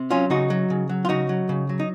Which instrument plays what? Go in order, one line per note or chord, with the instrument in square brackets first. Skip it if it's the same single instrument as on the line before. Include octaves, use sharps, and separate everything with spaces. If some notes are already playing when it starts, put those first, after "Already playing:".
Already playing: [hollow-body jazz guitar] C3
F#3 C#4 F4
C#3 D#4 F#4
F#3
C#3
F#3
F4
C#3 D#4 F#4
F#3
C#3
F#3
D#4